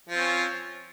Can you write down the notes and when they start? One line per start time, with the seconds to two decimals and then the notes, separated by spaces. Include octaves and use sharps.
0.09 F3
0.14 C4
0.19 C#4